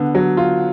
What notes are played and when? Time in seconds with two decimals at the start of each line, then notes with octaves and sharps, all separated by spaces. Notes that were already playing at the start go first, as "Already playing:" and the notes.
Already playing: D3 B3
0.15 F#3
0.37 F4